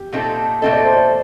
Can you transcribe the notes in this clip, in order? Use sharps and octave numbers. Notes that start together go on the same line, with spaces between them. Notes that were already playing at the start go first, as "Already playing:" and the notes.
Already playing: G4
A#2 A3 C4 D#4 A4
A#2 A3 C4 D#4 A4 D#5
D5
C5
D5